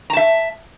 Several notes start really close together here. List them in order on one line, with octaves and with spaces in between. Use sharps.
A#5 A5 E5